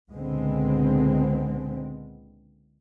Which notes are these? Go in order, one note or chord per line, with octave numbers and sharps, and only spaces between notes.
C#2 A#2 D3 G#3 B3 C4